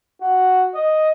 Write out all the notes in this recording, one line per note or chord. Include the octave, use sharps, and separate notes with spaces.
F#4
D#5